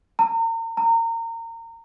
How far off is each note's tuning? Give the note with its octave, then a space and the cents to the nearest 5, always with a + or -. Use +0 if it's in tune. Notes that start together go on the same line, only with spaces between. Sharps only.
A#5 -35
A#5 -25